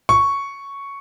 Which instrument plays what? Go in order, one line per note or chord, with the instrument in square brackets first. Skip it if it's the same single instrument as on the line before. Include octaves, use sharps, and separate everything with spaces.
[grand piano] C#6